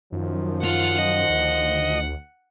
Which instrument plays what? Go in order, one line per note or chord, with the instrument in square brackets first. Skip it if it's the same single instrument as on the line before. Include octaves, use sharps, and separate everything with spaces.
[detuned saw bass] F#2 [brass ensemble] D#3 F3
[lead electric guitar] F4 [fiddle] F#5
[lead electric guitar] D#5
[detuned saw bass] D2